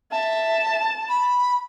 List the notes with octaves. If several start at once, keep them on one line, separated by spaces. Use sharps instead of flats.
E5 A5
B5